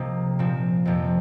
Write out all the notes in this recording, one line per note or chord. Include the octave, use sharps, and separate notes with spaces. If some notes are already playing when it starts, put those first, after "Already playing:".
Already playing: C2 C3 F3 A#3 C4 D#5
A#2 F3 C4
F2 C3 F3